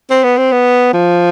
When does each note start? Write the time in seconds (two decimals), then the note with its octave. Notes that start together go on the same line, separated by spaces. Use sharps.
0.11 C4
0.24 B3
0.38 C4
0.52 B3
0.93 F3